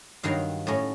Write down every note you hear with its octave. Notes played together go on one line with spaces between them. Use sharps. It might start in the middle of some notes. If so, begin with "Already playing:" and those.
G2 D#3 F#3 F5
A2 F#3 A3 C#4